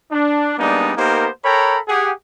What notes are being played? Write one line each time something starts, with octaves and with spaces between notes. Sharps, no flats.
D4
G3 G#3 A#3 B3 D4 D#4
A#3 B3 D#4 G4 A#4 C5
A4 A#4 C#5 G5 A#5 B5
G4 G#4 F#5